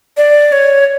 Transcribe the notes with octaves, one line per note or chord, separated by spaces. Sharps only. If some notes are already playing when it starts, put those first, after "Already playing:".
D5
C#5